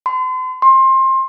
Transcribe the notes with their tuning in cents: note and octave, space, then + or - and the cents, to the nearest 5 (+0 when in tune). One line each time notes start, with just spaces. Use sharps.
C6 -40
C6 +25